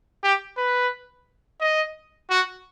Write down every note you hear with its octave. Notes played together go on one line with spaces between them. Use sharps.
G4
B4
D#5
F#4